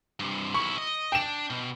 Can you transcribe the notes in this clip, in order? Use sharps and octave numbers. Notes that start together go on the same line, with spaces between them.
G2 C3
B1 E4 C#6
D#5
D4 G5 E7
B2